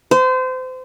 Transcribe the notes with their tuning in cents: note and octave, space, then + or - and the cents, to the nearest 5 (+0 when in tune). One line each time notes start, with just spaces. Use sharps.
C5 -30